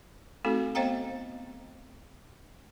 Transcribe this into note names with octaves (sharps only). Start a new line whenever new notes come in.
A3 C4 D#4 F#4 A4
B3 C5 D#5 F5 G5 A#5